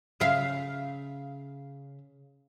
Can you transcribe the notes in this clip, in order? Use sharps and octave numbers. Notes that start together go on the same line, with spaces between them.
C#3 E5 F5